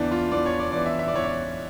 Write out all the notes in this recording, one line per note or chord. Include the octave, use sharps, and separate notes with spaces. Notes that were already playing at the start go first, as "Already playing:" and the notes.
Already playing: E2 E3 D4
F4
E2 E3 D5
C#5
D5
E2 E3 D5
E5
E5
D5
E2 E3 C#5
D5